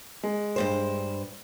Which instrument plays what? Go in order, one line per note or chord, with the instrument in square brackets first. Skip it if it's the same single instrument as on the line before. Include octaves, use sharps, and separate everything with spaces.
[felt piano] G#3
[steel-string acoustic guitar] G2 B2 C5